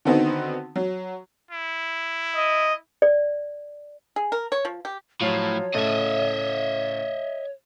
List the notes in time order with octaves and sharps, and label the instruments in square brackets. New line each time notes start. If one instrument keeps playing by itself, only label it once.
[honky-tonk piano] D3 D#3 B3 C4 D#4 F#4
F#3
[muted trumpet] E4
[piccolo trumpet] D#5
[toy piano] D5
[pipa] G#4
A#4
C#5
F3
G4
[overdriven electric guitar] A2 [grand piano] F3 F#3 F4 [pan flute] C#5
[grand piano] A2 C#3 A4 [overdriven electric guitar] D#5 E5